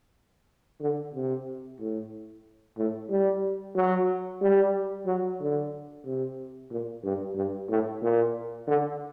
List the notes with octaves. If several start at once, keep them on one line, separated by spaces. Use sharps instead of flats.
D3
C3
A2
A2
G3
F#3
G3
F#3
D3
C3
A#2
G2
G2
A2
A#2
D3